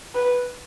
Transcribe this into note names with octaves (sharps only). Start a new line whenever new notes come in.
B4